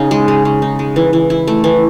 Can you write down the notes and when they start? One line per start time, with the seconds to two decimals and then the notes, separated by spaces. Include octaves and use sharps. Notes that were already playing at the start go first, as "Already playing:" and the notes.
Already playing: C#3 D#4
0.11 G#3
0.28 C#3
0.45 C#3
0.62 D#4
0.79 G#3
0.96 E3
1.13 E3
1.30 E4
1.47 A3
1.64 E3